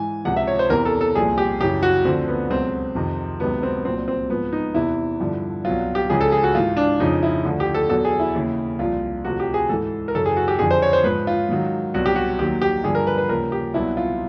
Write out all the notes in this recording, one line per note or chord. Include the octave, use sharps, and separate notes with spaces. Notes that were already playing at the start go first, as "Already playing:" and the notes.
Already playing: G#2 E3 G#5
C#2 C3 F3 F#5
E5
C#5
C5
E2 C3 E3 A#4
A4
A4
C2 A#2 F3 G#4
G4
F#2 C#3 E3 G4
F#4
D2 D3 F3 C4
B3
C#2 B2 F#3 C4
F2 C3 D#3
C#2 C3 D#3 F#3 B3
C4
C2 A#2 F#3 C4
C4
G#2 F3 B3
D#4
E2 C3 E3 E4
G2 D3 F3
C2 B2 F#3 F4
G4
C#2 C#3 F3 G#4
A4
G#4
F#4
G#2 E3 F4
D4
F2 C#3 F3 D#4
E4
D2 D3 F3
G4
A4
E2 B2 F#3 A4
G#4
E4
D#2 C#3 E3
C2 A#2 F3 F4
D2 C3 F3 F#4
G4
G#4
G#2 E3 A4
A#4
F#2 C#3 E3 A4
G#4
F#4
G4
F2 D3 F3 G#4
C5
C#5
C5
G#2 F3 B4
F4
G#2 D#3 F#3
C2 B2 F#3 F#4
G4
F#4
D#2 D#3 F#3 G4
G4
G2 D3 F3 G#4
A#4
B4
B4
D#2 C#3 F3 A#4
G4
C2 B2 F#3 E4
F4